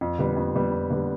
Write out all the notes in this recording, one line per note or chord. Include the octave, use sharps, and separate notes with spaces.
F2
D3 G3 B3
F2
D3 G3 B3
F2
D3 G3 B3